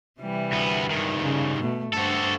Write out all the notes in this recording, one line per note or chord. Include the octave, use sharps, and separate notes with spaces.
C3 E3 G3
D2 B3
G2 D#3
C#3
B2 A3
G2 F#4 A4 C5